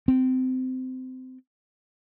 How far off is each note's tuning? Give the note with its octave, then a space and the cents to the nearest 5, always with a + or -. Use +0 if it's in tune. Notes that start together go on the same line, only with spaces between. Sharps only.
C4 -25